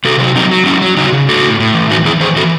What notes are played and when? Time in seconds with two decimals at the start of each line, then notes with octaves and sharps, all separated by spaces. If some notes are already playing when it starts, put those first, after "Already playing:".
0.05 C3 F#4 A4
0.20 F#3
0.36 F#3 C4 D#4
0.51 F#3
0.66 F#3 C#4 E4
0.81 F#3
0.97 C#3 D#4 F#4
1.12 C#3
1.28 A2 F#4 A4
1.44 A2
1.60 A2
1.74 E3
1.91 E3 D#4 F#4
2.05 E3 E4 G#4
2.20 E3 G#4 C5
2.36 E3 F#4 A4